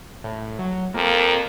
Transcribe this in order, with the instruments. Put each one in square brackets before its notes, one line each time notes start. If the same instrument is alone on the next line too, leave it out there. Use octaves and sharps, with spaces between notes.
[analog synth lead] A2
F#3
[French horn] F2 [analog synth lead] A#3